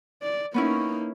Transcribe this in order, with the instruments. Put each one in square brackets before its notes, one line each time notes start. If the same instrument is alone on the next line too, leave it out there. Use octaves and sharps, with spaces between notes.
[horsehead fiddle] D5
[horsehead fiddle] A#3 D#4 [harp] B3 C#4 E4